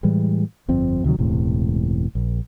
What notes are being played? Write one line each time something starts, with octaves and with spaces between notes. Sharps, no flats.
A2 E3 G3 G#3
G1 F2 C4
D2 C3 D#3 F#3
E1 C#2 A2 C3
A#1